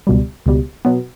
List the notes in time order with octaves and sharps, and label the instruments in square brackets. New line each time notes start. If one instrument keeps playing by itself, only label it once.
[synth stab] C#2 B2 G3
C#2 B2 G3
B2 F#3 B3